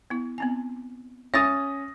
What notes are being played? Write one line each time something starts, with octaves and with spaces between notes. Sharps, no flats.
B3 E4
B3 C4 G#5
C#4 E5 G#5 D#6 A6 A#6